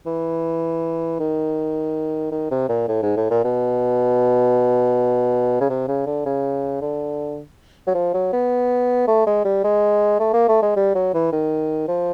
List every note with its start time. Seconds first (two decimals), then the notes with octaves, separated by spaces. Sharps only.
0.06 E3
1.20 D#3
2.32 D#3
2.51 C3
2.69 A#2
2.88 A2
3.02 G#2
3.17 A2
3.30 A#2
3.44 B2
5.61 C#3
5.69 C3
5.88 C#3
6.06 D3
6.26 C#3
6.81 D3
7.87 F#3
7.94 F3
8.14 F#3
8.33 B3
9.07 A3
9.26 G#3
9.45 G3
9.64 G#3
10.19 A3
10.33 A#3
10.48 A3
10.62 G#3
10.76 G3
10.95 F#3
11.14 E3
11.33 D#3
11.88 F3